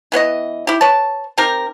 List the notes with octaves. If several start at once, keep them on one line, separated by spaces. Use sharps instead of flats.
E3 B3 C#5 D#5
E4 G4
B4 C#5 A5
C4 D#4 G4 A#4